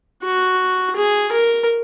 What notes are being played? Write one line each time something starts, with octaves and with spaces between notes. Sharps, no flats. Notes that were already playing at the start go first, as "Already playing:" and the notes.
F#4
G#4
A#4